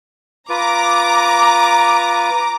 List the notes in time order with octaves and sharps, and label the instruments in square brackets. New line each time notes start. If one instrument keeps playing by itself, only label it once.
[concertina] F4 B4 [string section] A#5 D6